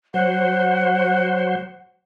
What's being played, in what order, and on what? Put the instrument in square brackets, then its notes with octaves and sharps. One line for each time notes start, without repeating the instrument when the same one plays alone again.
[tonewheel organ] F#3 C5 [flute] F#5